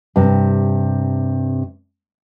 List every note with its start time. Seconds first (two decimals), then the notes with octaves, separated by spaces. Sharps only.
0.16 G2 C3